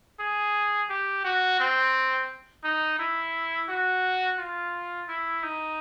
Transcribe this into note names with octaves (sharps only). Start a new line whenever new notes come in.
G#4
G4
F#4
C4
D#4
E4
F#4
F4
E4
D#4